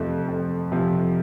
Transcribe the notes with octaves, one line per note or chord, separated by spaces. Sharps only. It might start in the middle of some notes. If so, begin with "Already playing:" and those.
Already playing: F2 C3 F3 A3
F2
C3 F3 A3